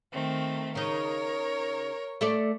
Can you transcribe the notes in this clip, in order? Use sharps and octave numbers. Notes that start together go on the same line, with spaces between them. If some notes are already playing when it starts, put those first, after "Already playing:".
D#3 A3 C4
C#3 D#4 A#4 C#5
A3 A4 D5